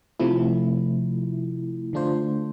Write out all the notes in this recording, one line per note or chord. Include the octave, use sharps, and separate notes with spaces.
C3 F3 A3 E4
D3 A3 D4 F4 C5